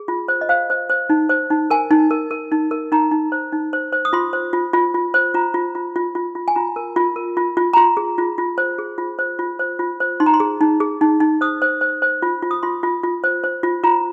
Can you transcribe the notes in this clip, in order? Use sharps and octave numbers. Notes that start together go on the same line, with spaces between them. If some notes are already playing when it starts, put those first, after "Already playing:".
Already playing: G#4
F4
C5
D#5
C5 F5
C5
C5
D#4
C5
D#4
A#4 G#5
D#4
A#4
A#4
D#4
A#4
D#4 A#5
D#4
C5
D#4
C5
C5
D#6
F4 C6
C5
F4
F4
F4
C5
F4 A#5
F4
F4
F4
F4
F4
G#5
F4 A#5
A#4
F4
A#4
F4
F4
A#5
F4 C6
G#4
F4
F4
C5
G#4
F4
C5
F4
C5
F4
C5
D#4 C6
A#5
C6
G#4
D#4
G#4
D#4
D#4
C5 D#6
C5
C5
C5
F4
F4
D#6
F4 C6
F4
F4
C5
C5
F4
F4 A#5